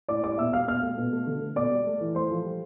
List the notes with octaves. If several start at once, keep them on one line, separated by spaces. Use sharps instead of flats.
A2 D5 D6
G3 D5 D6
B2 E5 E6
G3 F5 F6
B2 F5 F6
A3
B2
A3
D3
A3
B2 D5 D6
G3
A3
E3
A3 C5 C6
F3
G3